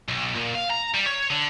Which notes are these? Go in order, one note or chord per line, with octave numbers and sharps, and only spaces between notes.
B1
A#2
F5
A#5
G3
C#5
D3